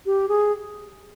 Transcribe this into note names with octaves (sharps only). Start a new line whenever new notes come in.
G4
G#4